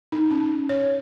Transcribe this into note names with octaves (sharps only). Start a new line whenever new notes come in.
D#4
C#4
C#5